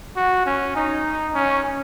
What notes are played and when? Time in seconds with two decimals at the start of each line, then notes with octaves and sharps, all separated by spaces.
0.17 F#4
0.46 C#4
0.76 D#4
1.34 C#4